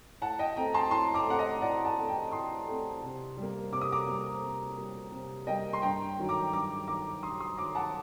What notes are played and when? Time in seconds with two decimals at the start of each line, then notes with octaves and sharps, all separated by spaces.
0.21 A2 F#5 A5
0.39 D#5 G5
0.56 A3 C4 G5 A#5
0.74 A5 C6
0.91 A2 A5 C6
1.14 A#5 D6
1.26 A3 C4 F#5
1.39 D#5
1.61 A2 D5 F#5
1.84 F#5 A5
1.97 A3 C4
2.08 G5 A#5
2.31 A2 C6 D#6
2.67 A3 C4
3.02 C3
3.37 G3
3.42 A#3
3.72 C3 D6
3.81 D#6
3.92 A#5 D6
4.07 G3 A#3
4.42 C3
4.78 G3 A#3
5.12 C3
5.47 G3 A#3 D#5 G5
5.73 C6
5.82 G2 G5 A#5
6.18 D#3 F#3
6.29 A#5 D6
6.53 G2 A#5 D6
6.88 D#3 F#3 A#5 D6
7.23 G2 C6 D#6
7.40 C6 D#6
7.57 D#3 F#3 A#5 D6
7.75 F#5 A5